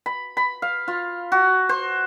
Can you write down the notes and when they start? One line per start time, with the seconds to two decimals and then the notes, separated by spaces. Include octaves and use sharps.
0.06 B5
0.37 B5
0.62 F5
0.88 F4
1.32 F#4
1.69 C5